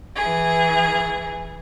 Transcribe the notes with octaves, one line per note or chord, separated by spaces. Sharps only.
E3 G#4